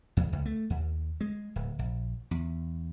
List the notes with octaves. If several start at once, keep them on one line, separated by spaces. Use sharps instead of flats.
E2
C#2
A3
D#2
G#3
D1
A#1
E2